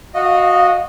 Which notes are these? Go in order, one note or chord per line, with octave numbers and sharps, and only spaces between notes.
F#4 D#5 F5